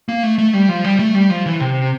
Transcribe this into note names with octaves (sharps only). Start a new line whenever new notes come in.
A#3
A3
A3
G3
F3
G3
A3
G3
F3
E3
C3